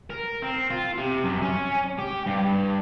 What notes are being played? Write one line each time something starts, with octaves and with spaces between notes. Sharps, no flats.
A#4
C4
F4
C3
F#2
C#4
G4
G2